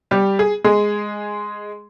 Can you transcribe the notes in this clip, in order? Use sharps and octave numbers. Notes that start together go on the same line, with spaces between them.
G3 G4
G#4
G#3 G#4